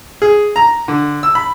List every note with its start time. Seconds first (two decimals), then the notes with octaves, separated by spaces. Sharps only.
0.22 G#4
0.56 A#5
0.88 D3
1.23 E6
1.35 B5